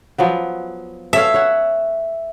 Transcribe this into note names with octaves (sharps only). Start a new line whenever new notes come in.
F3 F#3 B3
A4 C#5 E5 F5
C#5 F#5